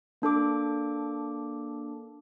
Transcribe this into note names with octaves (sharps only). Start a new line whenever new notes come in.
A#3 D4 A4 D6